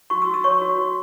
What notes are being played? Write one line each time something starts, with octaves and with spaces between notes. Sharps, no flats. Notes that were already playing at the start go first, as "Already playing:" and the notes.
F#4 C#6
E6
F#4
E6
C#5 C#6
F#4
F#4